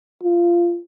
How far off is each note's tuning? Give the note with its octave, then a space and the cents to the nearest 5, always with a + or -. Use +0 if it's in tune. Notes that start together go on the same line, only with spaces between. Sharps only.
F4 -15